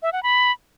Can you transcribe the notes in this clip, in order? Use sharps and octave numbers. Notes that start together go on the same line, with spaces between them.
E5
F#5
B5